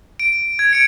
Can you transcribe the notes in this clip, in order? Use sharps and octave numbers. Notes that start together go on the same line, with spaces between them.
D7
G#6
C#7 D7